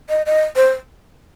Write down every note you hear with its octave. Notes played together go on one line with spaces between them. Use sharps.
D#5
D#5
C5